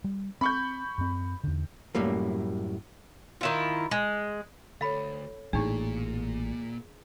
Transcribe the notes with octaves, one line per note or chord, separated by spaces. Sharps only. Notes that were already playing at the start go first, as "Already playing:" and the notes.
G3
C4 B5 C#6 G6
F#2 C4
E2 D3
F#2 A2 G3 A#3
D#3 E4 F4
G#3
D2 A4 C#5 F5 B5
A1 A#2 D4 D#4 G#4 C#6